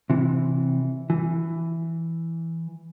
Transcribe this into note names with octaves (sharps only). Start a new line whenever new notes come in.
C3 E3
E3